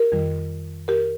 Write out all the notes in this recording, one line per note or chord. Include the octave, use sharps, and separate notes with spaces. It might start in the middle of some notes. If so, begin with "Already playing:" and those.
Already playing: G4 A#4
F2 D#3 G3
G4 A#4